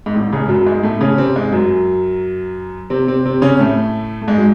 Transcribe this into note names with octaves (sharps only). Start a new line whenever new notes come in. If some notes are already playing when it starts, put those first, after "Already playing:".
G#2
A1 A2
C#2 C#3
F#2 F#3
G#2 G#3
A2 A3
C#3 C#4
C3 C4
G#2 G#3
F#2 F#3
C3 C4
C3 C4
C3 C4
C#3 C#4
A2 A3
A3
G#2 G#3
F#3